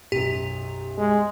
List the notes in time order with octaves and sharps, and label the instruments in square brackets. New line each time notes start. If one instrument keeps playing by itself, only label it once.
[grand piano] B1 F#2 [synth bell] G4
[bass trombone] G#3